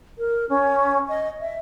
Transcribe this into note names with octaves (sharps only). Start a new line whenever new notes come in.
A#4
C#4
D#5
E5